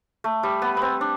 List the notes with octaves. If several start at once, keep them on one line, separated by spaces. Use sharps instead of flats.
A3
G3
B3
B3 C4
D4